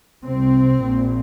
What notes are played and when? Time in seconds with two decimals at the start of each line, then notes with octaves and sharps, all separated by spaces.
0.25 C2 C3 C4
0.81 A#1 A#2